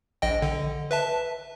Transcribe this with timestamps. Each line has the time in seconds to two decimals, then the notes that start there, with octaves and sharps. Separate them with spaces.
0.22 A#1 D#5 G5
0.42 D3
0.91 B4 E5 A5